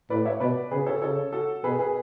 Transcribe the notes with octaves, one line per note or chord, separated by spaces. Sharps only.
A2 B4 D5
C#5 E5
B2 B4 D5
C#3 G#4 B4
A4 C#5
C#3 A4 C#5
F#4 A4
B2 G#4 B4
G#4 B4